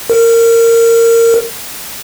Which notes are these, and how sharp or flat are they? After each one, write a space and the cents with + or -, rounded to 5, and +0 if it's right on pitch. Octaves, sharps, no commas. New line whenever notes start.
A#4 -20